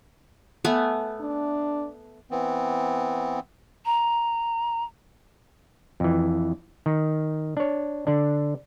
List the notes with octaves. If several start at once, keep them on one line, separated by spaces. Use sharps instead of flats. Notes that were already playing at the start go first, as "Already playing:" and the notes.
A3 B3 G#5
D4
E3 B3 C4
A#5
F2 E3
D#3
D4 C#5
D3 D4